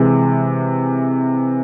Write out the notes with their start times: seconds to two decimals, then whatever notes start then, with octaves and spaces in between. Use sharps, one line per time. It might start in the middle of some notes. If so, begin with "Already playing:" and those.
Already playing: C3 E3 G#3